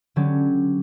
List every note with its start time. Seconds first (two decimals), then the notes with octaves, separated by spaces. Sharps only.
0.16 D3 F#3 C#4 G4